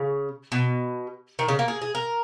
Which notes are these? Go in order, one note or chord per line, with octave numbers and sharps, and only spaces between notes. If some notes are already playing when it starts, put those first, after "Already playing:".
Already playing: C#3
B2
D#3
C#3
A#3
G#4
G#4
A#4